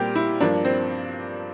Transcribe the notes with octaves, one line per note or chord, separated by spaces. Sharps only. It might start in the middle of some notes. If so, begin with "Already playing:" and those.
Already playing: A#2 G3 C4 G4 A#4
E4
G2 F3 A#3 D4
C4